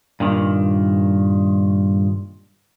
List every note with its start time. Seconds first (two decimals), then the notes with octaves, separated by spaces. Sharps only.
0.20 G2 A#2 D#3